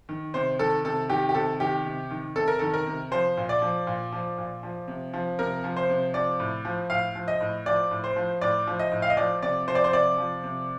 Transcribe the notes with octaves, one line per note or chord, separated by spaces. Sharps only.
D#3
C3 C5
D#3 A4
C3 A4
D#3 G4
G4
C3 A4
D#3 G4
C3
D#3
C3 A4
A#4
D#3 A4
A#4
C3
F3 C5
A#2
D5
F3
A#2
F3
A#2
F3
C3
F3
C3 A#4
F3
C5
C3
F3 D5
A2
F3
A2 F5
F3
D#5
A2
F3 D5
A2
C5
F3
A2 D5
F3
D#5
A2
F5
D#5
F3 D5
C3 D5
F3 C5
D5
C5
C3 D5
F3
C3